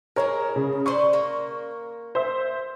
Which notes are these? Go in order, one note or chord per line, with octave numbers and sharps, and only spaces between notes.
G#3 E4 G#4 A#4 C#5
C#3
D4 B4 C5 C#6
A#3 A#4
C5 E5